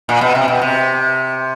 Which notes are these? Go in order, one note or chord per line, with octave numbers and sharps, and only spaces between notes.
A#2
B2
C3
B2
C3